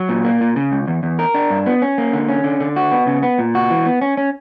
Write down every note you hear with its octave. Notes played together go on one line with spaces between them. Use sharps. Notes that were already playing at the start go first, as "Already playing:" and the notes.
Already playing: F#3
A#2
A#3
A#2
C#3
C#2
E2
E2
A#4
D4
G2
B3
C#4
A#3
D3
C#4
D3
D3
F#4
B3
C#3
B3
A#2
F#4
E3
B3
C#4
C#4